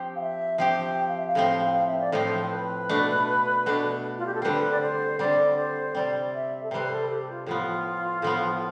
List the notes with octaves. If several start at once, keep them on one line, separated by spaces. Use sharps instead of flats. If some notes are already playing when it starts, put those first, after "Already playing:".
Already playing: F3 C4 G4
F5
E5
F3 C4 G4 G5
G5
F5
E5
F5
A2 F3 C4
F5
E5
D5
A2 F3 C4 C5
B4
B2 A3 D4
B2 A3 D4
F4
G4
A4
D3 G3 C4 B4
D5
C5
D3 G3 C4 D5
C5
C3 G3 C4 D5
E5
A4
C3 G3 C4 B4
A4
G4
F4
A2 F3 B3 F4
A2 F3 B3